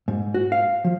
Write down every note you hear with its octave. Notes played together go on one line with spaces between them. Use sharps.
G#2
F#4
F5
F3